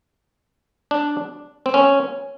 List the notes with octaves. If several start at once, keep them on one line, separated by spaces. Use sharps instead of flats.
D4
C4
C#4